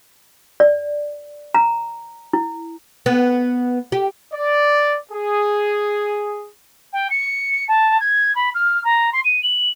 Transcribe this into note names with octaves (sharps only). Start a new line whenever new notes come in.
D5
A#5
E4
B3
G4
D5
G#4
G5
C#7
A5
G#6
B5
F6
A#5
C6
D#7
F#7